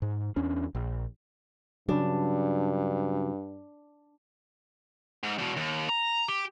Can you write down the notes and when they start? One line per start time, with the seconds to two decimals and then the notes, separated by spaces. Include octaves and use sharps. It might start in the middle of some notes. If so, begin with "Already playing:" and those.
0.02 G#2
0.36 E2 C#4 D4
0.75 A#1
1.89 G2 C#3 F#3 D4
5.23 G#2
5.38 E2 B2
5.56 D#2
5.89 A#5
6.28 G4